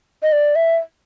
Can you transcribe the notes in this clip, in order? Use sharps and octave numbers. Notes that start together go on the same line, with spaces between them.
D#5
D5
E5